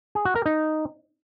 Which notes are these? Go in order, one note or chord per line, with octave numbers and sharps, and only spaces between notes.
G#4
F#4
A#4
D#4